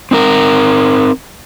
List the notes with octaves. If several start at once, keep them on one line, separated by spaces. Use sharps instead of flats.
C4 D#4 A#4